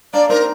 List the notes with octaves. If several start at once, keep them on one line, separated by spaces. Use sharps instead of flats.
A#3 D4 D5
C4 D#4 A#4